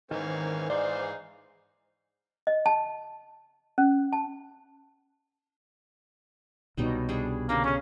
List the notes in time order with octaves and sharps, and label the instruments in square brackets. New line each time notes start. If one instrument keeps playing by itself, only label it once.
[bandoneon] G#2 E3 [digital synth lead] D#3 [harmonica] A#3 C4 C#4
[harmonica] D#4 G#4 F5 [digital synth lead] C5 [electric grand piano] D5
[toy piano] D#5
A5
C#4
A5
[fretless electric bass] C2 B2 [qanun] F#3 G3 D#4
[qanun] G3 D4 G#4
[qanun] D3 G3 C#4 [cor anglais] A#3
[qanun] C#3 G#4 [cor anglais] C#4